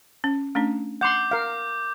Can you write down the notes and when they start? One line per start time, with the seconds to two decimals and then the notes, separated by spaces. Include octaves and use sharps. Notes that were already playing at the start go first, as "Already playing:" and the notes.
0.24 C#4
0.55 A3 C#4 D4
1.01 F#5 C6 D6 G6
1.31 A#4 F5